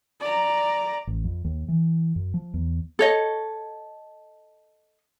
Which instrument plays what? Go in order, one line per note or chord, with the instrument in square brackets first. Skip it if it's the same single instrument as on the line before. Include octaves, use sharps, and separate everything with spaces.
[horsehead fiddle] D5 A#5
[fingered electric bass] A1
F2
D#2
E3
F#2
F3
E2
[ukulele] A4 C#5 D#5